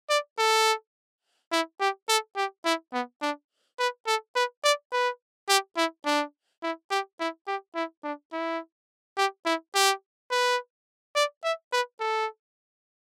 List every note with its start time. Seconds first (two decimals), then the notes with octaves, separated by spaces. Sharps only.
0.10 D5
0.39 A4
1.52 E4
1.80 G4
2.09 A4
2.37 G4
2.65 E4
2.93 B3
3.22 D4
3.79 B4
4.07 A4
4.36 B4
4.64 D5
4.92 B4
5.49 G4
5.77 E4
6.05 D4
6.63 E4
6.91 G4
7.20 E4
7.47 G4
7.75 E4
8.04 D4
8.33 E4
9.17 G4
9.46 E4
9.74 G4
10.31 B4
11.16 D5
11.44 E5
11.73 B4
12.01 A4